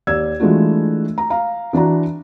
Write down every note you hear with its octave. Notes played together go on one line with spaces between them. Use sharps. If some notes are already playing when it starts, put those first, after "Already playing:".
D#2 D5 E6 G#6
E3 G#3 A3 D4 F4 F#4
A#5
F5 A#5
E3 D4 F#4 D5 A#5